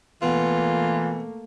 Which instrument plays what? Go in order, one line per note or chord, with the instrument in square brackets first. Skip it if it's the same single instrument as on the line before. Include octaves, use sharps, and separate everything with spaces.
[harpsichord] B2 [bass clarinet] E3 [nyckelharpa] A3 A#3 [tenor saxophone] F4